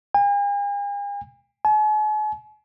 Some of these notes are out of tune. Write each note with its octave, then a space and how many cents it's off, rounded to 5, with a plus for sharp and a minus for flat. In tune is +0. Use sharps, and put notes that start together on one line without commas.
G#5 -45
G#5 +45